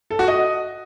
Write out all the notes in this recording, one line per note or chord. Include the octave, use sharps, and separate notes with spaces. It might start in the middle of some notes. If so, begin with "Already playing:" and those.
A4
F#4
D#5